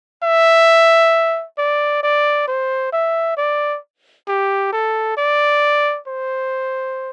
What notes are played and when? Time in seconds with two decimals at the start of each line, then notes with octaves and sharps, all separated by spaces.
0.23 E5
1.58 D5
2.03 D5
2.48 C5
2.93 E5
3.38 D5
4.28 G4
4.73 A4
5.17 D5
6.08 C5